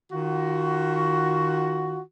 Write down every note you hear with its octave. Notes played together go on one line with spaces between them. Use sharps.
D#3 F4 F#4